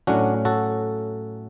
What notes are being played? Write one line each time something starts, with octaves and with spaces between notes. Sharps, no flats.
A2 F#3 C#4 D4 F#4
F#4 A4